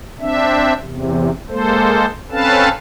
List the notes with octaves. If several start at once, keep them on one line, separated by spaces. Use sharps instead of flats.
C4 D4 E5
E2 C3
G#3 A#3 A4 C5
C4 C#4 A4 B4 F5 A5